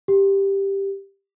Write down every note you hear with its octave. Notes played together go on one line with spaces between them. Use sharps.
G4